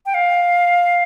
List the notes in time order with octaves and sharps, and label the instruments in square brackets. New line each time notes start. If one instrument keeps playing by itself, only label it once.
[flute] G5
F5